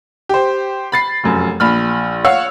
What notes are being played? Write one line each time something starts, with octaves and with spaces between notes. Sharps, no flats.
G4 C5
B5 A6 C7
F1 F#2
A#1 B5 F6
C#5 F5 F#5 E6